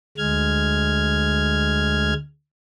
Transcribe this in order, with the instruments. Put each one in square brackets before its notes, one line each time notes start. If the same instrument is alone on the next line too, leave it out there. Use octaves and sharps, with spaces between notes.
[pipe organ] D2 G#3 F6 G#6